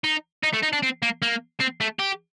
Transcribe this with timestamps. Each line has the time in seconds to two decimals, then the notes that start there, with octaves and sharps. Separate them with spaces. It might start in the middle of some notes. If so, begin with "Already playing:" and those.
0.04 D#4
0.43 D#4
0.53 A3
0.63 D#4
0.73 D4
0.83 C4
1.03 A#3
1.22 A#3
1.60 C4
1.81 A3
2.00 G4